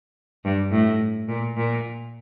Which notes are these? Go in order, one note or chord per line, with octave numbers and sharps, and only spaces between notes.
G2
A2
A#2
A#2